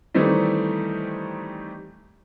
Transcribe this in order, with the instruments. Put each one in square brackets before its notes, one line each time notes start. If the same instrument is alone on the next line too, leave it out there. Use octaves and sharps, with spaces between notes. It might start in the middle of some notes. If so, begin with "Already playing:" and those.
[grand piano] D#3 E3 G3 A3 C4 D#4